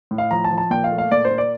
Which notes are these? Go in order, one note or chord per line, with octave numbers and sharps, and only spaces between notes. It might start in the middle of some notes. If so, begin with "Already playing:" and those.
A2
F5
F3 A#5
A5
F3
A5
A#2 G5
F5
A3
F5
A#2 D5
C5
A#2
D5